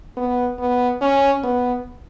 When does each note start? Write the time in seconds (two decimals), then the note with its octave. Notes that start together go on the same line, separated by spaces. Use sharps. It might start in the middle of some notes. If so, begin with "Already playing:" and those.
0.17 B3
0.59 B3
1.01 C#4
1.43 B3